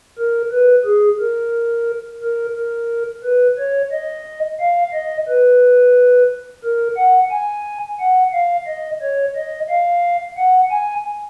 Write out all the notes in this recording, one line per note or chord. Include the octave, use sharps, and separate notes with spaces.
A#4
B4
G#4
A#4
A#4
A#4
B4
C#5
D#5
F5
D#5
B4
A#4
F#5
G#5
F#5
F5
D#5
C#5
D#5
F5
F#5
G#5